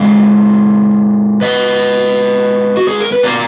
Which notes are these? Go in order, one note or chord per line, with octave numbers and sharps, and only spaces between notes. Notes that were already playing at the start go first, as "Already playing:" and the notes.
Already playing: A#2 G#3 F5
B4 D#5
F#4
G#4
A#4
B4
B2 A#3 A#4 D5